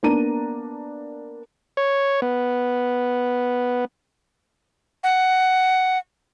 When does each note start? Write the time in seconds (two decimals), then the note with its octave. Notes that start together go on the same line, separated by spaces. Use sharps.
0.03 A#3 B3 D4 A#5 D#7
1.77 C#5
2.22 B3
5.04 F#5